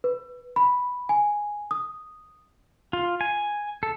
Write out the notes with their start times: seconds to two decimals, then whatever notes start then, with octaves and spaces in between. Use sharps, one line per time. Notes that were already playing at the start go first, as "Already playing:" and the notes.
0.04 B4
0.56 B5
1.09 G#5
1.71 D#6
2.93 F4
3.21 G#5
3.83 A4